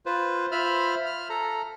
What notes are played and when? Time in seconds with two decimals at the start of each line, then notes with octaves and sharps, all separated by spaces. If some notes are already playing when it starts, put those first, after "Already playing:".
0.06 F4 B4 C5
0.51 F4 C5 E5 B5 F6
1.06 F6
1.30 A4 A#5